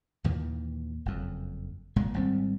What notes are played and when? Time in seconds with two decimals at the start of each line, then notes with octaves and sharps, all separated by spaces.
0.24 D#2 A#2 D#3 E3
1.06 F#1 F2
1.96 F#1 A#2 G#3
2.14 G#1 G3 C4